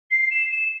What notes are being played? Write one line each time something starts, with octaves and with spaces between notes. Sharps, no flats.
C7
E7
E7